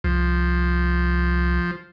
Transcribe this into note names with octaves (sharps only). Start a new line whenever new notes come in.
C2 F3